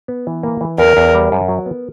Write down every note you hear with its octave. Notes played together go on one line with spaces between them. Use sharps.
B3
E3
A#3
E3
E2 A#4
E2
G3
F#2
F#3
B3